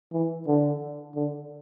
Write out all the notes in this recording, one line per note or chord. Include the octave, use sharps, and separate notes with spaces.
E3
D3
D3